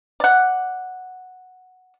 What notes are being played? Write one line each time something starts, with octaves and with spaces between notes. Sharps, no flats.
D5 F#5